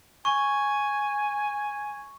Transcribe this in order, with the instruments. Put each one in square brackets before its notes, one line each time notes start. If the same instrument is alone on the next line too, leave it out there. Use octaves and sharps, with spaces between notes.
[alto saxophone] G#5 [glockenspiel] C#6